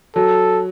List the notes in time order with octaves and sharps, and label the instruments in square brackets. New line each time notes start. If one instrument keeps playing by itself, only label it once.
[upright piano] F#3 [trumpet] A4